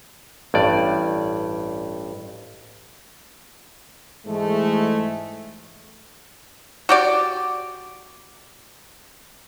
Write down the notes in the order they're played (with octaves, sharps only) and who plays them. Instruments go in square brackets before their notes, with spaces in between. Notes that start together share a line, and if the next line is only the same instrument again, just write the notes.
[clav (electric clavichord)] A1 G2 D5
[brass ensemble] G#2 E3 G#3 A3
[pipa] F#4 G4 D5